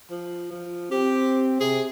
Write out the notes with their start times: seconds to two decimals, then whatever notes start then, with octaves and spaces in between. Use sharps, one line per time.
0.11 F3
0.51 F3
0.91 C4 G4
1.60 C3 G#4